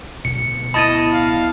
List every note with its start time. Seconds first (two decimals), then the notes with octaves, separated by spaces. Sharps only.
0.25 D1 B1 B2 C#7
0.74 B3 E4 D#5 A5 B5 A6 D#7
1.13 F5